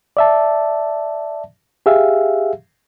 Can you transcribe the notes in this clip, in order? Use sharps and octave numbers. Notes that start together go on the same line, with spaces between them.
D5 E5 A5
G4 G#4 E5 F5